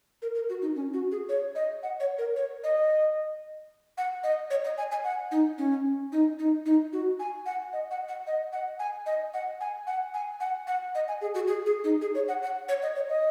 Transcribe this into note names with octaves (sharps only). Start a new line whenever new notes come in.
A#4
A#4
F#4
D#4
C#4
F#4
G#4
C#5
D#5
F#5
C#5
A#4
C#5
D#5
F#5
D#5
C#5
D#5
G#5
G#5
F#5
D#4
C#4
D#4
D#4
D#4
F#4
G#5
F#5
D#5
F#5
F#5
D#5
F#5
G#5
D#5
F#5
G#5
F#5
G#5
F#5
F#5
D#5
G#5
G#4
F#4
G#4
G#4
D#4
G#4
C#5
F#5
F#5
C#5
D#5
C#5
D#5